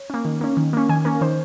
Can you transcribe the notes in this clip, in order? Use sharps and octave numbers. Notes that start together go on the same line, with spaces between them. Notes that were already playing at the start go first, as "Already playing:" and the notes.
Already playing: C#5
A#3 C#4
D#3
A#3 C#4
D#3
A#3 C#4
D#3 G#5
A#3 C#4 A#4
D#3 C5